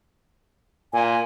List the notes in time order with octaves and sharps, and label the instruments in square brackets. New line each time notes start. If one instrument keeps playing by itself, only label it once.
[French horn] A#2 [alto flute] G#5